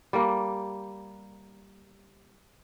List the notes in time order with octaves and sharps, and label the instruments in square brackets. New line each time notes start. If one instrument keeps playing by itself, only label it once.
[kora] G3 A#3